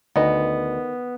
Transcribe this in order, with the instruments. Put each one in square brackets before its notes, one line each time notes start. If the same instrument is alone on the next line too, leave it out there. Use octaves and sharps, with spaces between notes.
[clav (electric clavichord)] D2 [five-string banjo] D#3 D#5 [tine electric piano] B3